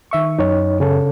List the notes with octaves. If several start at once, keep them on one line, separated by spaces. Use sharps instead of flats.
D#3 E5 C#6
F#2 D#4 C#5
C#3 C#4 A4